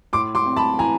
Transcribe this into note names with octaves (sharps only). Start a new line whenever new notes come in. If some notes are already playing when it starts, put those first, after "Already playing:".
A2 C6 D6
C6 D6
C4
A5 B5
E3 G#5 A#5